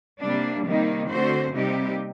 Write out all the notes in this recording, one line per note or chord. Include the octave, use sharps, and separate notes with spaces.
C3 G3 A#3 D4
C3 D#3 G3 A#3 D#4
D3 A3 C4 F#4 C5
C3 G3 A#3 D#4 G4